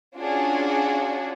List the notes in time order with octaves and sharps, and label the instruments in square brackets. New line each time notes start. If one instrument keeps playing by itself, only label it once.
[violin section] C#4 D4 F4 F#4 G#4